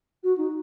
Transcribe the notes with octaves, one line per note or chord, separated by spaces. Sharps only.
F#4
D#4